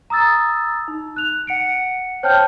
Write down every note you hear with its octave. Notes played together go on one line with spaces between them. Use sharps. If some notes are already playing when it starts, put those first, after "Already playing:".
A#5 D#6 E6 A6
D#4
F#6 F7
F#5 C#7 D7
C5 C#5 G5 A5 F6 G6